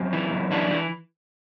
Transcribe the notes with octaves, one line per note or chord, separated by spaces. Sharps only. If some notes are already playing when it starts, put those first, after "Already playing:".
Already playing: F#2 C4
E3
F#2
E3 D4
E3